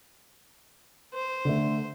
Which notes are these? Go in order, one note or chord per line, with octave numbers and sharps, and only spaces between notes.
C5
D3 A3